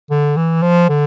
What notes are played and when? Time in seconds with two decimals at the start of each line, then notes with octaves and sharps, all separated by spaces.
0.11 D3
0.37 E3
0.62 F3
0.89 D3